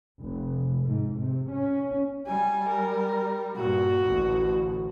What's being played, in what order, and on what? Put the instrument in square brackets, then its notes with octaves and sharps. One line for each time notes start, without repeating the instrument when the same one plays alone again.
[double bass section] F1
G#2
C3
C#4
[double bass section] G3 [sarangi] G#5
[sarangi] A#4
[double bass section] G2 A#2 [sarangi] F#4
[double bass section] A1 D2